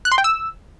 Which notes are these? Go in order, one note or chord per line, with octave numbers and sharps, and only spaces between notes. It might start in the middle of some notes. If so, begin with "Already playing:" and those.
F#6
C6
G5
E6